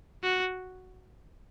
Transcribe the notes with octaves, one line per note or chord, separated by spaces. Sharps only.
F#4